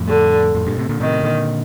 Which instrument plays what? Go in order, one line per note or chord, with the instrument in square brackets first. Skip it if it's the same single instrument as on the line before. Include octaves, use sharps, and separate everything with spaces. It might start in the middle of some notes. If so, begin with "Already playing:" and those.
Already playing: [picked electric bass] F2 A2
[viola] D3
[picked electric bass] F2 A2
G2 A#2
A2 C3
A#2 D3
[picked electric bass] A2 C3 [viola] D#3
[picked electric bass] A#2 D3